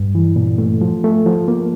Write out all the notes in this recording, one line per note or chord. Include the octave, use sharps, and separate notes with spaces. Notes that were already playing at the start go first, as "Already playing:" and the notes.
Already playing: G2
E3
A#2
A3
F3
A3
F3
A#3